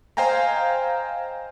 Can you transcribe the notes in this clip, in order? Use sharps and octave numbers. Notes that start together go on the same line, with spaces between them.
C5 D#5 F5 G5 G#5 A#5